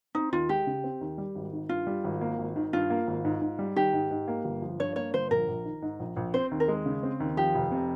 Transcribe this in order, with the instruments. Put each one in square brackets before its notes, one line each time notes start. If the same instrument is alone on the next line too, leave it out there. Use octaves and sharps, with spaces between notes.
[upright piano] C4 [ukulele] D#4
[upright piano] D#2 [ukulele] F4
[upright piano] G#3 [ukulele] G4
[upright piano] C#3
C4
D#2
G3
G#1
D#3
[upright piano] G2 [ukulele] F4
[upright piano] G3
G#1
A#3
G#1
D#3
[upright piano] G2 [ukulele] F4
[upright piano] A#3
G#1
G#2
G#2
G3
[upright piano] D#3 [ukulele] G4
[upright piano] G#2
G#2
A#3
G1
F3
[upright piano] G2 [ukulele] C#5
[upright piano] A#3 [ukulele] C#5
[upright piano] G1 [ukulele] C5
[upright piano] A#1 [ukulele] A#4
[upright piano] A#1
D#3
G#2
A#1
A#1
[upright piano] C4 [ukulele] C5
[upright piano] D#2
[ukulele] A#4
[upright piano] G#3
C#3
C4
D#2
[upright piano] F3 [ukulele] G4
[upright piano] F1
C3